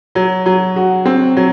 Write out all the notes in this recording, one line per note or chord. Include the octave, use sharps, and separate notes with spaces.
F#3
F#3
F#4
C4
F#3